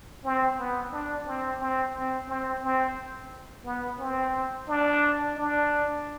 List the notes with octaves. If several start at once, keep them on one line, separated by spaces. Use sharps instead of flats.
C4
B3
D4
C4
C4
C4
C4
C4
B3
C4
D4
D4